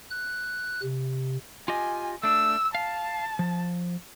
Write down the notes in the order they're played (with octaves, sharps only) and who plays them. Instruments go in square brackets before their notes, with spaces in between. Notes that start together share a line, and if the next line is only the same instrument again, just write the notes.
[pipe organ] F#6
C3
[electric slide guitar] F4 G4 D#5 [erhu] G#5
[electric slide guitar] A3 D4 [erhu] E6
[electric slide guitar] F5 [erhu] A5
[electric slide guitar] F3